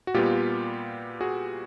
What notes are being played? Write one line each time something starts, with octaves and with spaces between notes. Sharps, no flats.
F#4
A#2 G3 B3 F4 G4
F#4 G#4